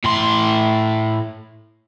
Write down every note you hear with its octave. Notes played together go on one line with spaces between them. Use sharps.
A2 C6